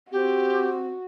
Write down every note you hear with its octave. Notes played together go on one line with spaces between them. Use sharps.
C4 F#4 G4